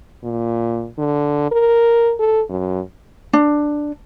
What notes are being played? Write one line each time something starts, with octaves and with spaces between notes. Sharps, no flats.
A#2
D3
A#4
A4
F#2
D4